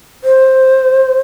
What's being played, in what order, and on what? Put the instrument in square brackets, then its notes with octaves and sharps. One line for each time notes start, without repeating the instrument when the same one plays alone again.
[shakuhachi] C5